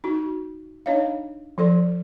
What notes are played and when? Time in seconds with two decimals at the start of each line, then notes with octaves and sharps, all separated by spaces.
0.04 D#4 F#4
0.86 D4 D#4 C#5 D#5 F5
1.58 F3 A4 D5